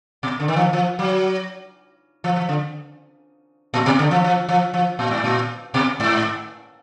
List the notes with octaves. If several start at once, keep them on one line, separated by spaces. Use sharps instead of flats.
B2
D3
D#3
F3
F3
F#3
F3
F3
D3
A#2
B2
D3
F3
F3
F3
F3
A#2
G#2
A#2
B2
G#2